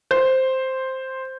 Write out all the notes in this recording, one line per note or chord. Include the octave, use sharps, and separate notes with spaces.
C5